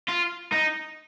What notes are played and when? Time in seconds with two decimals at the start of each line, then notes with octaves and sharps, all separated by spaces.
0.09 F4
0.52 D#4